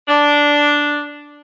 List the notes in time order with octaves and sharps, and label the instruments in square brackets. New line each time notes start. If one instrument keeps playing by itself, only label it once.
[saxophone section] D4